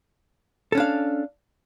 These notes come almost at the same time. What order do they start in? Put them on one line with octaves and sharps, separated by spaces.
A4 C#4 D4 F5